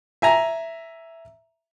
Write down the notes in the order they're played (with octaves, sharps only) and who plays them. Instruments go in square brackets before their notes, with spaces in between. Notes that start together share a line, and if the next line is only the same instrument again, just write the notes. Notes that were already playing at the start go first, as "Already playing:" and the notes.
[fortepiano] E5 G#5 A#5